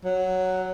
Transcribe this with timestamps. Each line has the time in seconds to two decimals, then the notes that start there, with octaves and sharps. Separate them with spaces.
0.05 F#3